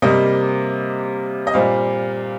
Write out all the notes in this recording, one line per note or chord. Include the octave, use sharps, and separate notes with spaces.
C3 G3 A#3 D#5
D#5
A#2 G3 C4 F5